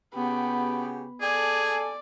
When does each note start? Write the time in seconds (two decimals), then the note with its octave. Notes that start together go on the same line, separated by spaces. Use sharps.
0.14 C#3 B3 F#4 G4
1.22 G#4 A4 D5 G#5